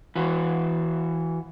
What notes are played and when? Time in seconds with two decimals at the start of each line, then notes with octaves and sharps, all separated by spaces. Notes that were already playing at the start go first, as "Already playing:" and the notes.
0.15 E3 F#4